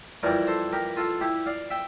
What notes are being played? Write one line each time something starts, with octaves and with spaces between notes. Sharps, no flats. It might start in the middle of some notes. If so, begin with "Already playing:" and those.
F2 E3 G3 A#4 D5
A4 C5
G4 A#4
F4 A4
E4 G4
D5 F5
E5 G5